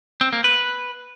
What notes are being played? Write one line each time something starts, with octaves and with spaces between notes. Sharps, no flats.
C4
A#3
B4